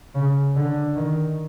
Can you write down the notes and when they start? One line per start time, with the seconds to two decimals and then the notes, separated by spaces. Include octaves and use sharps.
0.15 C#3
0.56 D3
0.96 D#3